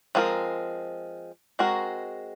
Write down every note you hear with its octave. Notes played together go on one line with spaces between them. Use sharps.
F3 G#3 C4 F#4 A#4
G#3 C4 F#4 A#4